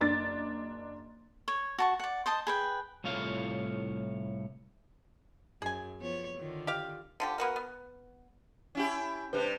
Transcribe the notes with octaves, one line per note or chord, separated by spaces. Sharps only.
F#1 D4 A6
C#5
F#4 A5 C#6
D5 F#5
C5 D#5 A5 D#6
G#4 B4 G5
C2 A2 F4 C#5 F5
F#2 G#4 G#5
F3 B3 C#5
D3 D#3 F4
G4 F5
D3 F3 G4
A#3 B3 F#4 A#4
B3
C#4 E4 G4
C3 G3 D4 B4 C5 F#6